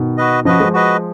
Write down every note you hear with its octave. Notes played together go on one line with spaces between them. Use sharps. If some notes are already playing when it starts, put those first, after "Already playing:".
Already playing: B2 D#3
F#4 B4 D#5
C#3 F3 F#4 B4 D#5
F3 G#3
F#4 B4 D#5